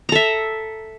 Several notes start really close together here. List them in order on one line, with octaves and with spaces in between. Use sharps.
A#5 A4 E5